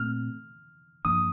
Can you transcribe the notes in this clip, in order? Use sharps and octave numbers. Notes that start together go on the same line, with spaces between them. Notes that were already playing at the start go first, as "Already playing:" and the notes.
Already playing: A#2 A3 C4 F6
G2 F3 A#3 D4 D#6